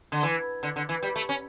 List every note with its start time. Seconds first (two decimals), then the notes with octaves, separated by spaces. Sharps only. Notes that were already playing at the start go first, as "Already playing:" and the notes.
0.12 D3
0.23 E3
0.63 D3
0.76 D3
0.89 E3
1.03 G3
1.16 A3
1.29 C#4